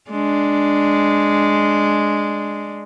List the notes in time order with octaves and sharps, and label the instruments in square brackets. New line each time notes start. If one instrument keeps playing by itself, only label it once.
[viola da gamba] G#3 D4